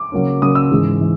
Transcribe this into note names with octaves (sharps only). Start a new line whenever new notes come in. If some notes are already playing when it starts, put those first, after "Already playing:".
Already playing: D6
C#3 F#3 A#3 C#4
C#3 F#3 A#3 C#4 D#6
E6
G#2 E3 G#3
E3